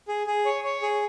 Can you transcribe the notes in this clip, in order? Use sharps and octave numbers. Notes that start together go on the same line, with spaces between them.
G#4
G#4
C#5
C#5
G#4